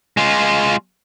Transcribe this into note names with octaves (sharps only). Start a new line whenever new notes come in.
G#3 F4